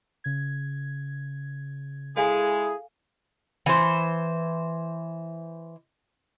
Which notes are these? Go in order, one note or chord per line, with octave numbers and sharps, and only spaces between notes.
C#3 G#6
G#3 E4 G#4 A4 F5 G#5
E3 C5